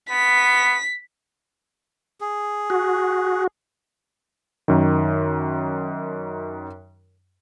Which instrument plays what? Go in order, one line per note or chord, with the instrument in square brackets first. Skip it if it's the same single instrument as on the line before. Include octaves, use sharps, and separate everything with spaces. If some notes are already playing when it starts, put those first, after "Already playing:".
[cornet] B3 [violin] B6
[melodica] G#4
[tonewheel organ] F#4
[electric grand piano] F#2 D#3